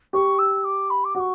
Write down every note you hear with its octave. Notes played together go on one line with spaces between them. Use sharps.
G4 C#6
E6
D6
B5
D6
F#4 C#6 D6